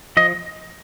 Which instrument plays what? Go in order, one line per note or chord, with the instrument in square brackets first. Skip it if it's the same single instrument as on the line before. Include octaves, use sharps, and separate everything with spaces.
[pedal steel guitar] F3 D#5